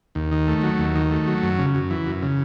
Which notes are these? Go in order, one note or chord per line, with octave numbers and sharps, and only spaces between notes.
D#2
D#3
A3
F#3
D#2
D#3
A3
F#3
F#2
C#3
F#2
E3
F#2
C#3